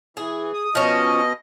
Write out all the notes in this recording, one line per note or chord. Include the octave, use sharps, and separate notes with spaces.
E3 G#4
D#6
B2 F3 C#4 D#5